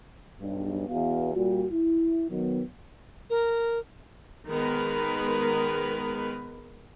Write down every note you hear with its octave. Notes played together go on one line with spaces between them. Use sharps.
B1 G2
E2 B2 B3 F#4 F5
A#2 G3 F4 F#4
E4
D#3 F#3 B3
A#4
D#3 G#3 B3 A#4 B4